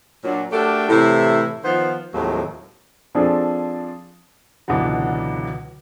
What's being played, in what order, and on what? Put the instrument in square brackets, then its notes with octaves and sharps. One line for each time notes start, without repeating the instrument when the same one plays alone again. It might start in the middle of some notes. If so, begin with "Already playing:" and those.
[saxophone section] A#2 F#3 D4
A3 D4 F#4 G4 A4 A#4
A2 C3 E3 E4
D#3 F3 B3 F4 C5
D#2 A2 F3 F#3 G#3 C4
[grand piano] F3 C4 D4 G#4 A4
C#2 B2 D3 E3 F#3